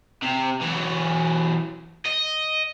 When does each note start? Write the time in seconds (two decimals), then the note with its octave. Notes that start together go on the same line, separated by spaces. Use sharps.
0.23 C3
0.62 E3 F#3
2.06 D#5